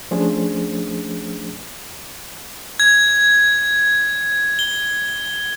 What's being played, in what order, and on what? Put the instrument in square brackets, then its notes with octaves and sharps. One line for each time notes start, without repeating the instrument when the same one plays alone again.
[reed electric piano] F3 A3 C#4 D4 G#4 C5
[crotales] G#6
G7